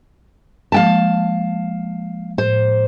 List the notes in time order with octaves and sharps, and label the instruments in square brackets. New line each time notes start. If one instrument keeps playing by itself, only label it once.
[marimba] F3 G#3 A#3 [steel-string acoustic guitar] F5 G5 A5
[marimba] A2 [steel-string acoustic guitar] C5